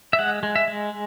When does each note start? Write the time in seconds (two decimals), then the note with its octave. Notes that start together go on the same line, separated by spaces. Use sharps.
0.13 E5
0.19 G#3 F#5
0.43 G#3
0.56 E5
0.68 G#3